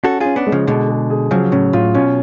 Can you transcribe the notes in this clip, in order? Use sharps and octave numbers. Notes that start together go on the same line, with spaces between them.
C#4 F#4 A4
C#4 F4 G#4
B3 D4
G#3
C#3 F3
B2 D3 G#3
G#4
G#4
C#3 F3 F#3
A2 C#3 C#4
A2 F4
B2 C#4